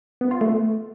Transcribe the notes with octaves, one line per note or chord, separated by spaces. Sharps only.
B3
F4
A3